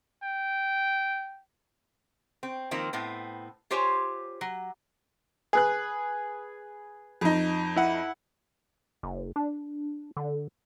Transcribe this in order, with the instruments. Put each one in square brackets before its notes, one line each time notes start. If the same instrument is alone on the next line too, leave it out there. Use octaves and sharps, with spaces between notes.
[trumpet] G5
[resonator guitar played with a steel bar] C4
D#3 F3 A#3 C4
A2 B3 C4
F4 G4 C5 C#5 G#5
F#3
[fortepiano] G#4 B4 F#6
[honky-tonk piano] F2 D#4
[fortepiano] E4 F#5
[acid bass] F#1
D4
D3